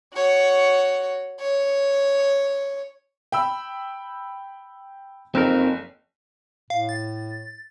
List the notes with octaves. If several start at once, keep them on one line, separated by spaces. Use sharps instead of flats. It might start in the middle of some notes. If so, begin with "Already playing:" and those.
F#4 C#5
C#5
G5 B5 E6
F#1 F2 C4 D#4 A#4
A2 F5
A6